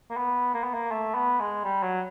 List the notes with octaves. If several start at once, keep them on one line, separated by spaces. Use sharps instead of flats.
A#3
B3
A#3
B3
A#3
A3
B3
G#3
G3
F#3